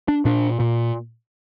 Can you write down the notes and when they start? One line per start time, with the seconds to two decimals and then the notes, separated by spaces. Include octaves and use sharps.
0.08 D4
0.25 A#2 D4
0.60 A#2